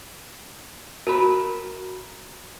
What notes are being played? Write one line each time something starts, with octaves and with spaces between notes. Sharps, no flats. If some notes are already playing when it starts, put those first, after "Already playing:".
F#4 A#4 A5 B5